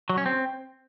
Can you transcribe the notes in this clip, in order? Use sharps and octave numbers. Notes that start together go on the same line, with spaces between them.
F#3
C#4
C4